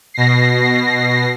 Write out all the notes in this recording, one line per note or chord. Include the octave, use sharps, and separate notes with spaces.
B2 A#6 C7